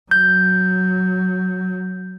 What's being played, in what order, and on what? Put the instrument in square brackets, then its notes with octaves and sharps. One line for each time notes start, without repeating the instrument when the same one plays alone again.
[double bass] F#3 [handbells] G6